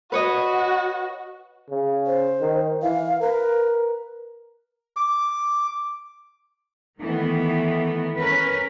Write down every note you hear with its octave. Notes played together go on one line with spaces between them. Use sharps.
F#4 B4 C#5 D#5
C#3
C5
D#3
E3 F5
A#4 B4
D6
D#3 E3 A3 B3
C#4 A#4 B4